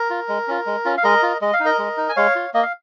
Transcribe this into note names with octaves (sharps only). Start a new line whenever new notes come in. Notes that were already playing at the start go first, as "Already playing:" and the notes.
Already playing: A#4
F4
G#3
C#4 F4
G#3
C#4 F4
F5
G#3 A#4 D#5
F4
G#3 D#5
F5
D#4
A#4 D#5
G#3
D#4
G#5
G#3 C#5 F5
F4
A#3 D#5
F5